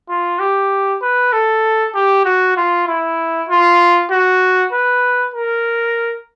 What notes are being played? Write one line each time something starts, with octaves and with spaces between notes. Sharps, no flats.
F4
G4
B4
A4
G4
F#4
F4
E4
F4
F#4
B4
A#4